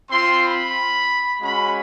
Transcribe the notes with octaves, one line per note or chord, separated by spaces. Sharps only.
C4 F4 C6
B5
G#3 C#4 F#4 B5